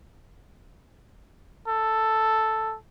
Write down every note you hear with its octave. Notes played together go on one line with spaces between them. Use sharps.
A4